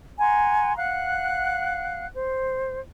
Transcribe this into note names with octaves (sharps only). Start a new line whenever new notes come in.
F#5 G#5 A#5 C6
F5 F#5 F#6
C5